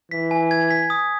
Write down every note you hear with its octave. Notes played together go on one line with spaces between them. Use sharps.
E3 B6
G#5
G#6
B6
D#6